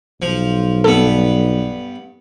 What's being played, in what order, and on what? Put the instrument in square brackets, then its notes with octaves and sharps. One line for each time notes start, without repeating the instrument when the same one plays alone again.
[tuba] B1 [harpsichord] F3
[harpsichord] G2 B3 [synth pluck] A4